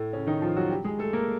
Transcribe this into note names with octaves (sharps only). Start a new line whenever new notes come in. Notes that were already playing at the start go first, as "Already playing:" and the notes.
Already playing: A2 A3
C#3 C#4
D#3 D#4
F3 F4
F#3 F#4
G3 G4
G#3 G#4
A3 A4
A#3 A#4